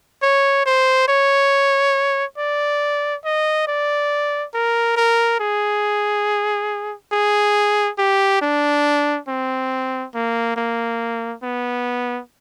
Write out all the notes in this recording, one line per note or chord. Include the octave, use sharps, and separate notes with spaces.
C#5
C5
C#5
D5
D#5
D5
A#4
A#4
G#4
G#4
G4
D4
C4
A#3
A#3
B3